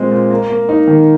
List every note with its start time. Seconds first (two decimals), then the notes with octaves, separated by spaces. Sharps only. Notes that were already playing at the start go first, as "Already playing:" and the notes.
Already playing: A#2 G#3 C4
0.11 A#2
0.31 A#3
0.50 A#3
0.69 D#4
0.87 D#3